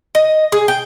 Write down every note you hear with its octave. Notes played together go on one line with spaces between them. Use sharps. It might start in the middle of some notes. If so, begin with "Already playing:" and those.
D#5
G#4
G5